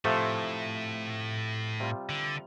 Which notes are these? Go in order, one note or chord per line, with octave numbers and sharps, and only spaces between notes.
A2 C3 F3 A3 C4 A4
C3 G3 F4 C5
D3